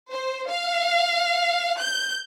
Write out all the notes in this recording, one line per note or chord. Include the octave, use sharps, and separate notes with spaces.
C5
F5
G6